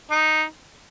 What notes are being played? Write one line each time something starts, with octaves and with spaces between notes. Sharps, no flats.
D#4